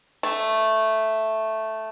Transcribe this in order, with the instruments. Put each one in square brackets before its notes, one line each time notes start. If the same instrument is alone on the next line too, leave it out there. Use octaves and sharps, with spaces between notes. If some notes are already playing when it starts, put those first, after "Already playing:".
[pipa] A3